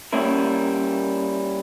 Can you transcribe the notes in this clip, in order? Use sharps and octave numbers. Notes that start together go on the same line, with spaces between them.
G3 A#3 C#4 E4 A#4